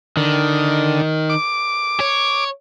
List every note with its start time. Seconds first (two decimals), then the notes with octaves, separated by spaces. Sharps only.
0.17 D3 D#3
1.29 D6
2.00 C#5